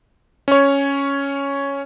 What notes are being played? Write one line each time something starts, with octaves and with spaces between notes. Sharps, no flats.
C#4 C#5